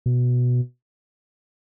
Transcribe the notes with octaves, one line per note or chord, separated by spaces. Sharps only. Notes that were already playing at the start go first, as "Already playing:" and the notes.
B2